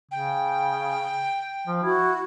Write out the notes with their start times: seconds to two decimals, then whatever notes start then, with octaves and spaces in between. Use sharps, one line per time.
0.11 C#3 G5
1.67 F3
1.83 E4 F#4